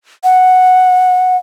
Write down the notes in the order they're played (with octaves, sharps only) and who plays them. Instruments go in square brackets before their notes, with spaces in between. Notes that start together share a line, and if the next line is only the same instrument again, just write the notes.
[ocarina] F#5